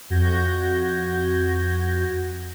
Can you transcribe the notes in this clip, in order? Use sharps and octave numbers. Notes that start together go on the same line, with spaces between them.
F2 F#4 G6 G#6 A#6